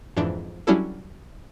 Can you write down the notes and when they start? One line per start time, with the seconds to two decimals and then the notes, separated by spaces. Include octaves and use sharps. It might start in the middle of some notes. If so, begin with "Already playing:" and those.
0.17 F2 G#2 E3 D4
0.67 F#3 G3 C#4 D4 E4 A4